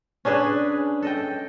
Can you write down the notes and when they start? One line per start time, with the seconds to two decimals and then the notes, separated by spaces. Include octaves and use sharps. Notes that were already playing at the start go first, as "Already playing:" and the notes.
0.25 C#4 D4 G#4 B4
1.02 A4 D#5 G5